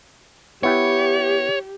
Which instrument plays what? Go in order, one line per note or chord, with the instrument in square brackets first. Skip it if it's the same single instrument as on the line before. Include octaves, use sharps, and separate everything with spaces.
[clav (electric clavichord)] B3 E4 G5 [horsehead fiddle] G4 [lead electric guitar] C#5